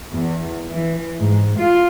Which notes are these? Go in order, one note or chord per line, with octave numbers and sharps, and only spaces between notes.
E2
E3
G#2
F4